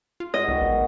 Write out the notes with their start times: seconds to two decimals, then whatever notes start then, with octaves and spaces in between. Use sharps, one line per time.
0.20 F4
0.34 G#2 F#4 D#5
0.48 C2 D#3 B3 F#4
0.61 A1